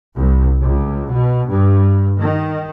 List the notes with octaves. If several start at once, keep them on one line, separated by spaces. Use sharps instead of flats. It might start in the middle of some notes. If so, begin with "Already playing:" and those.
C2
C#2
B2
G2
D#3